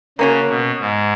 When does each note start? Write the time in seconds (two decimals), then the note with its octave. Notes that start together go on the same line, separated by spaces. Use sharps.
0.18 C#3 A#3 C#4 F#4
0.50 B2
0.80 G#2